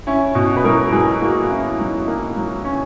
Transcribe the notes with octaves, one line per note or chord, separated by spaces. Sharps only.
C#4 E4
B2 F#4
B4
F#3 A#4
F#3 G#4
A#3 F#4
C#4 E4
F#3 D#4
A#3
F#3
C#4